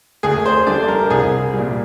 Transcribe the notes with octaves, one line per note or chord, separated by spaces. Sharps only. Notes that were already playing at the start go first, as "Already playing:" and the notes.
D2 G#4
C5
D3 G3 D5
A#4
C2 G#4
A#2 G3